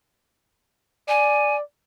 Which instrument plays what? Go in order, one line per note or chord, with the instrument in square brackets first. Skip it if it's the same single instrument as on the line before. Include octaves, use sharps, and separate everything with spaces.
[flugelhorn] D5 [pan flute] G#5